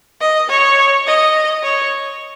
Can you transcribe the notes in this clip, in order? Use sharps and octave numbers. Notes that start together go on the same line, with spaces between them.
D#5
C#5
D#5
C#5